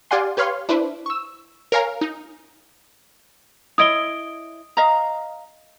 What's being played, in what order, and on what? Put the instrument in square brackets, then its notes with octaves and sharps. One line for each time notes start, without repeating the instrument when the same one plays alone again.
[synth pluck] G4 D5 F5 F#5 G#5 C6
G4 B4 C#5 F5 C6
D4 E4 B4 C5
C#6 E6
A#4 C#5 F5 G#5 A#5
D#4
[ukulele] E4 C#5 D#5 [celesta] D#6 D7 G7
[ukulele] D#5 F5 A#5